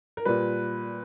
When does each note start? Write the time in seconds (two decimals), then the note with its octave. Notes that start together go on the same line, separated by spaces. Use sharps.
0.17 A#4
0.25 A#2 G3 B4